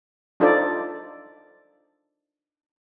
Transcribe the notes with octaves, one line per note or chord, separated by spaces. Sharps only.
D4 D#4 F4 A4 C5 D5